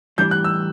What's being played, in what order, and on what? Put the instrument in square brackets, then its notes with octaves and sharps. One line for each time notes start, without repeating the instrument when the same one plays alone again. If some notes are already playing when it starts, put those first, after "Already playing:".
[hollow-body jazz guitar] A2 E3 G3 D4 [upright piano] G6
[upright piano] F#6
E6